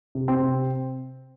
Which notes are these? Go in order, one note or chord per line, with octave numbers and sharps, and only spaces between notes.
C3
C4
C3